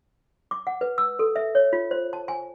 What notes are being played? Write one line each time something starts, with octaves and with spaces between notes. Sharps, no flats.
D6
F#5
B4
E6
A4
E5
C#5
F4
C5
A5
G#5